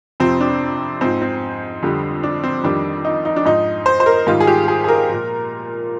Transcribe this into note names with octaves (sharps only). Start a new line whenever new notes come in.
F2 C3 F3 C4
D4
G#2 F3 C4
C4
F2 D3 G3
D4
C4
F2 D#3 G3 D4
D#4
D#4
D4
G#2 F3 D#4
C5
C5
A#4
G#2 D#3 G3 F4
G#4
G4
G#4
G#4
A#4
A#2 F3